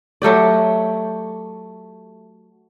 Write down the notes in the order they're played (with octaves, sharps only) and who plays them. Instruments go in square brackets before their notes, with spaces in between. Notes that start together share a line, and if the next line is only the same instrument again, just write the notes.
[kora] F#3 A3 G4 D5